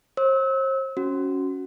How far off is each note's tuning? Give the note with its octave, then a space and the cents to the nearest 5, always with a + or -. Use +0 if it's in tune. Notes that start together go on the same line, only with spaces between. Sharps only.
C5 +40 E6 -35
C#4 +0 F#4 +0